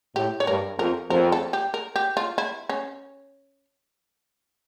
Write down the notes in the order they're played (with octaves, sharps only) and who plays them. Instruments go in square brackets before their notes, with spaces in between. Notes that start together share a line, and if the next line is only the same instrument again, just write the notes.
[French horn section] A2 [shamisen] G4
[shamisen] C#5
[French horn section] G2 [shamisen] A#4
[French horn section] F2 [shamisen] A#4
[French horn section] F2 [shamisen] A#4
[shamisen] A4
G4
A#4
G4
F4
E4
C#4